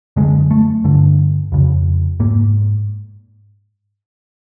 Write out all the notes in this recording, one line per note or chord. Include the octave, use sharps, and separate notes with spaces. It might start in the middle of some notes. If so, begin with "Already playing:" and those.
F#2 D3 G#3
A3
G2 D3
F2 C#3
G#2 A#3